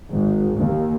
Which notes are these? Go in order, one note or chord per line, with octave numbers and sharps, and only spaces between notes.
G#1
D#2